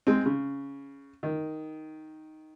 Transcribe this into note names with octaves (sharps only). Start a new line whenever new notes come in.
G#3 C4
C#3
D#3